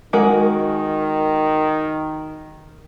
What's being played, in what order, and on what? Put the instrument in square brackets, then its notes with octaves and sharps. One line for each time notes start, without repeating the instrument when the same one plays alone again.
[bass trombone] D#3 [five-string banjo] G#3 F#4 A#4